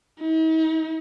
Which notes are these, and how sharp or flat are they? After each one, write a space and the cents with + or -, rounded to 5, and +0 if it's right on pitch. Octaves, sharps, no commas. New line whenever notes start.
D#4 +45